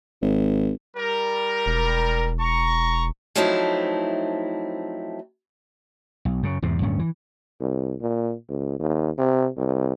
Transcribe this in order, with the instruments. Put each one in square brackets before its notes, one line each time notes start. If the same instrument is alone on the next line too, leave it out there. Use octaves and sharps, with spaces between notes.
[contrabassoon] G#1
[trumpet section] G3 A#4
[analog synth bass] E1
[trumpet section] A#5 C#6
[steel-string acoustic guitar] F3 F#3 A3 C4 D#4 E4
[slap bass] B1
F#2 C#3
E2 G#2 C3
D1 G2 A#2 C#4
E3
[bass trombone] C2
A#2
C#2
D#2
C3
C2